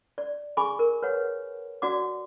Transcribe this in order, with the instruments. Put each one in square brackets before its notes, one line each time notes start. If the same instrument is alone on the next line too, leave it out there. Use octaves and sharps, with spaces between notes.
[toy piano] D5
G#4 G#5 B5 C#6 D6
A#4
B4 C#5 F#5
F#4 D5 F#5 D6